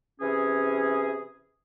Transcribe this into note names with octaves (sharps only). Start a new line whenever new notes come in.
C3 E3 C#4 G#4